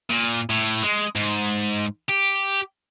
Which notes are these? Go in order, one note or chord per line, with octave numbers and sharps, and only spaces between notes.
A#2
A2
G#3
G#2
G4